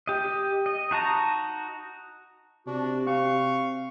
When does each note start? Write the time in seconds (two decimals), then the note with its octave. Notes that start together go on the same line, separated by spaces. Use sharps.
0.07 G4 D#5
0.66 D#5
0.91 D#4 F#4 A5 A#5
2.67 C3 D4 F#4
3.07 C4 F5 C#6